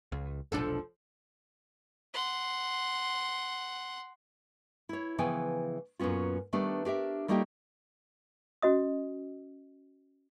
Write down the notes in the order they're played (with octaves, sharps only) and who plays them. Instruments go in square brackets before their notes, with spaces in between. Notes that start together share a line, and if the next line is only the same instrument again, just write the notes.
[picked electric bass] C#2
[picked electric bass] F1 B1 D4 [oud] F3 A4
[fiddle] F#5 C6
[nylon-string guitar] E4 C#5
C#3 E3 F3 B3 G5 G#5
F#2 A#2 B3 C#4 F4
D#3 G3 A3 B3 D4
D4 G4 A#4 E5
G3 A3 A#3 D#4 F4 G4
[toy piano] C#4 F#4 D#5 D#6